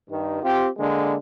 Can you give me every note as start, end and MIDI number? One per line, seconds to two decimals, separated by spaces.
0.10 0.39 43
0.10 0.39 51
0.43 0.69 60
0.43 0.69 65
0.43 0.69 67
0.79 1.15 50
0.79 1.15 56
0.79 1.15 58
0.79 1.15 62